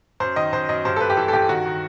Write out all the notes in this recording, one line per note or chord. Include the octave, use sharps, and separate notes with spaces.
F#2 C5
D#3 D#5
F#2 C5
F#2 D#5
G2 C5
A4
G2 B4
G4
E3 A4
A4
G2 G4
D#3 F#4
D#3